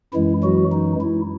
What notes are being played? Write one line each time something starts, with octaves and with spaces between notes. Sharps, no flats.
F#2 E3 G#3 E4
F#3 F#4
D#4
E4